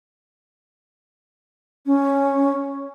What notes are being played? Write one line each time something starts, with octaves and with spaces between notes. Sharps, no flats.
C#4